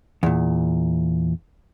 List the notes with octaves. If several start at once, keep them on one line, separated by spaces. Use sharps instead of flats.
E2 A#2